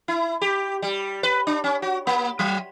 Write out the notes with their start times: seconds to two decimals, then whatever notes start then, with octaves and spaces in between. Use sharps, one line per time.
0.08 E4
0.42 G4
0.82 G3
1.23 B4
1.47 D4
1.64 C#4
1.82 F#4
2.07 A#3
2.39 F#3